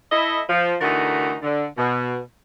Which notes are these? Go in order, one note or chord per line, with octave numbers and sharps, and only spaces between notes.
E4 A4 D#5
F3
D3 E3 A3 D#4 F#4 A#4
D3
B2